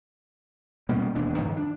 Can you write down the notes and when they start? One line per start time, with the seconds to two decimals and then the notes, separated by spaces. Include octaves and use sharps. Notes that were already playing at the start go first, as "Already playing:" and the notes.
0.89 B2 G3 A#3 C#4
1.15 E1 D#2 D4
1.38 G2 D#3 F3
1.57 D4